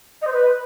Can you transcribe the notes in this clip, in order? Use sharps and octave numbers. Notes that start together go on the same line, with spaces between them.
D#5
C5
B4